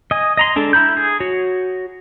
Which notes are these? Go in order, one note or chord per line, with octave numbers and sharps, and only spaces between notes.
D#5 G#5
D#5 A#5 C6
G#3 D4 A4
E4 A#5 B5 G6
G#4
F#4 C#5